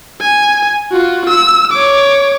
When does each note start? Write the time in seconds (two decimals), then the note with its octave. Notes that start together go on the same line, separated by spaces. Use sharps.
0.20 G#5
0.91 F4 F#4
1.29 E6
1.72 C#5 D6